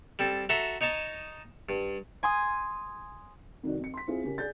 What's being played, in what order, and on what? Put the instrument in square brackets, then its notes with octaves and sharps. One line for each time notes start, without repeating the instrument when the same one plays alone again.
[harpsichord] G3 C4 A4
F#4 A4 E5 A#5 C6
D#4 C#5 D#5 A5
G2
[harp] G#5 C6 D#6
[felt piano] C2 F2 D#3 F#4 D5
F2 C#7
C6 B6
C4 E4 F4 G#4
C#3 C#4 G4 A#4
G#4 D5 G6 A6